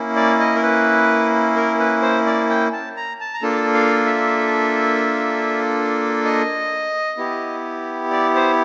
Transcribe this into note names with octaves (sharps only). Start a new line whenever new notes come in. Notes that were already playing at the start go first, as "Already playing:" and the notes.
Already playing: A#3 C#4 E4
D5
D#5
A#4
B4
A#4
B4
C5
D5
G5
A5
A#5
A5
A#5
A#3 D4 F4 A4 A5
F5
E5
D#5
B3 E4 G4
D5
C5